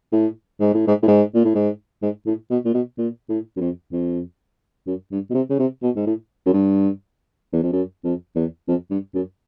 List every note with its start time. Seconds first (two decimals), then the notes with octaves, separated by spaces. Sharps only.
0.12 A2
0.60 G#2
0.74 A2
0.87 G#2
1.02 A2
1.08 G#2
1.35 A#2
1.45 A2
1.55 G#2
2.02 G#2
2.26 A2
2.51 B2
2.65 A#2
2.74 B2
2.98 A#2
3.29 A2
3.56 F#2
3.60 F2
3.92 F2
4.87 F#2
5.12 G2
5.30 B2
5.34 C3
5.50 C#3
5.59 C3
5.83 B2
5.96 G#2
6.06 A2
6.46 F#2
6.53 G2
7.53 E2
7.63 F2
7.72 F#2
8.04 F2
8.36 E2
8.68 F2
8.90 G2
9.14 F#2